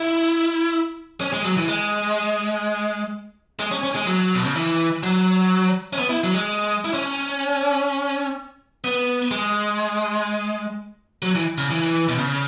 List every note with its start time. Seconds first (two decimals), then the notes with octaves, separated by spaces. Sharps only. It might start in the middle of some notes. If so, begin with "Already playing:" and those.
Already playing: E4
1.21 C#4
1.33 G#3
1.45 F#3
1.57 E3
1.68 G#3
3.59 G#3
3.71 C#4
3.83 C#4
3.95 G#3
4.07 F#3
4.35 B2
4.45 C#3
4.55 E3
5.03 F#3
5.93 C#4
5.98 B3
6.09 E4
6.24 F#3
6.34 G#3
6.85 E4
6.94 C#4
8.84 B3
9.31 G#3
11.22 F#3
11.35 E3
11.58 C#3
11.70 E3
12.08 B2
12.18 C#3